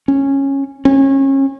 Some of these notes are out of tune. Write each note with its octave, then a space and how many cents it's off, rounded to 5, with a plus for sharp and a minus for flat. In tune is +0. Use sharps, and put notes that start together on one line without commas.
C#4 -10
C#4 -30